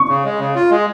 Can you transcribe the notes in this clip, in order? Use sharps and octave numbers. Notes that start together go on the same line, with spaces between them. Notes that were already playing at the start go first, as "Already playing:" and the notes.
Already playing: C#6
C#3
G#3
C#3
F4
G#3